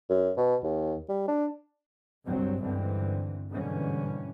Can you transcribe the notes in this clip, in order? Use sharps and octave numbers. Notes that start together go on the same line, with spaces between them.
F#2
B2
D#2
G3
D4
G1 C2 G2 F#3 C4
C#2 G2 D3 E3 C4
G#2 B2 D3 E3 G3 C#4